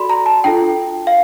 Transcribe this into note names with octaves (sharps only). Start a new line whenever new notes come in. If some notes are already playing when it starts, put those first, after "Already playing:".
Already playing: F#4 A4 D5 B5 C6
A#5
A5
D4 F4 A4 G5
F5